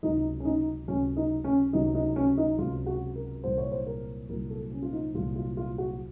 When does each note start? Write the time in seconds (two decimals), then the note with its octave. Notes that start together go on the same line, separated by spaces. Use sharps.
0.03 C#2 C3 F#3 D#4
0.40 C#4
0.45 D#4
0.88 C#2 C3 F#3 C#4
1.17 D#4
1.44 C#4
1.73 C#2 C3 F#3 D#4
1.95 D#4
2.16 C#4
2.38 D#4
2.58 C#2 C3 F#3 F4
2.86 F#4
3.16 A#4
3.44 C2 A#2 F#3 C5
3.58 C#5
3.72 C5
3.86 A#4
4.29 C2 A#2 F#3 A#4
4.50 A4
4.72 C#4
4.82 F4
4.93 D#4
5.15 C2 A#2 F#3 F4
5.36 F4
5.57 F4
5.78 F#4